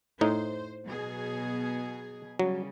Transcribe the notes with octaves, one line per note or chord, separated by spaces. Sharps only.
A2 D#4 C5
B2 F#3 G#4
C#3 F#3 G3